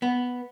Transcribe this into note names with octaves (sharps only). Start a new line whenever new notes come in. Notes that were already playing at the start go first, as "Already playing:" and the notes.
B3